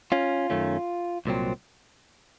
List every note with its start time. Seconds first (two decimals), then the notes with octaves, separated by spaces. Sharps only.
0.12 C#4 F4
0.50 F#2 D#3 A3 C#4
1.26 C2 A#2 F#3 C4